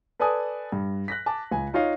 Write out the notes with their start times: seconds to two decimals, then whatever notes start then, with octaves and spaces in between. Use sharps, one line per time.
0.19 A4 B4 D5 G#5 A5 D#6
0.72 G2
1.08 F#6 A#6 B6
1.26 A5 D6
1.51 C#2 G#5
1.74 D#4 F4 C#5 D#5 F5